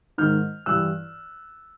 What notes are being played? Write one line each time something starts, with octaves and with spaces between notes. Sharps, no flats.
G#2 D#3 F6 G6
G2 E3 E6 F#6